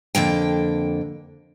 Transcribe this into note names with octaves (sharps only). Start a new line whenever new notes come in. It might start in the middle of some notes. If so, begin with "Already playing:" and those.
F2 D3 A#3 G5